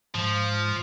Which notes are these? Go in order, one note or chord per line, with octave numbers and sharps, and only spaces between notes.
G#2 F3